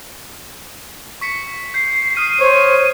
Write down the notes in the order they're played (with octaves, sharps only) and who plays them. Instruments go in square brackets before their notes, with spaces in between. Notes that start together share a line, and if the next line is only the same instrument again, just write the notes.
[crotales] C#6 B6 C#7
[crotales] G6 [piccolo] C7
[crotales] D#6 F6 C7 [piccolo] D#7
[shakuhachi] C5 [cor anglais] C#5